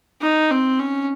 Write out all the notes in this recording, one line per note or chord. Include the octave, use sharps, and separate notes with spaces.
D#4
C4
C#4